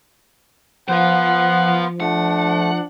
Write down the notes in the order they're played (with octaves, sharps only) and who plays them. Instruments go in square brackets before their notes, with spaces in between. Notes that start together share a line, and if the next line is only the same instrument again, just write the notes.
[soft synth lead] F3 [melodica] B3 F4 [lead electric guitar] C5 F5 [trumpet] F#5
[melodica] A3 [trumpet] D4 [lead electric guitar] F#5